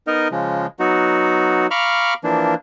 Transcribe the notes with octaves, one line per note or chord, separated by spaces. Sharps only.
B3 D#4 A#4 D#5
C#3 F3 G#3
F#3 B3 D#4 F#4
F5 A#5 B5 C#6 D6 F6
E3 F3 A#3 D4